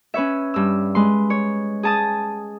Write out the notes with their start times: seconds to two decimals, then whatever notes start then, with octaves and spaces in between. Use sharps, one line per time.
0.14 C#4 B4 C#5 E5
0.54 G2 E6
0.95 G#3 B4 C6
1.30 C#5
1.83 G#4 A5 D#6